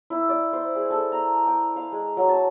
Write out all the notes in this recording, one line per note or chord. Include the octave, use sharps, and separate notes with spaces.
E4
D5
C5
G#4
A4
A#5
G5
F5
G#3
F#3
A5